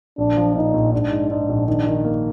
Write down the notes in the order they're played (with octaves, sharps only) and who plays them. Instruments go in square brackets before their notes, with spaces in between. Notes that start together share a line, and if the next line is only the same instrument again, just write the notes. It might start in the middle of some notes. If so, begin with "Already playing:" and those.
[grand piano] A#1 [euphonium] D4
[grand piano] F3
[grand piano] A#2 [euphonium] D#4
[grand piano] A#1
[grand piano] G#2 [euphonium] D4
[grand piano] G#2
[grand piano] G#2 [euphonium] D4
[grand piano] A#1
[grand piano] D#3 [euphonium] D4
[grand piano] D#3
A#3